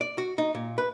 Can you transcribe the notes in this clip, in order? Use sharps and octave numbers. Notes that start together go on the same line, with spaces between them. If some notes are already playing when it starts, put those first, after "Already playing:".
D5
F#4
D#4
A#2
B4